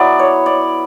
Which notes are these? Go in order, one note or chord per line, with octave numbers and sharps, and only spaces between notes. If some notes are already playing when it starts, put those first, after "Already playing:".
Already playing: F#3 B3 E4 D5
C#5
D5